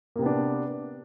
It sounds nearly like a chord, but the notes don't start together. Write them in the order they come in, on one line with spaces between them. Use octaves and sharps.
A#3 C3 B3 D4